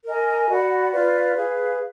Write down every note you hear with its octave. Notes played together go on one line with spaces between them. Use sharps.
A#4 D#5 G#5
F#4 D5 F#5 B5
F4 B4 D5 F5
G#4 B4 F5